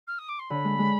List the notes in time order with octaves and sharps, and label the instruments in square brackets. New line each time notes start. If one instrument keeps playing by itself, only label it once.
[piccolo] F6
D#6
D6
C6
[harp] D3 [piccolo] B5
[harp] G#3
G#3